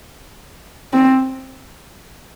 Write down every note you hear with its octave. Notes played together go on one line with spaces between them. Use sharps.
C4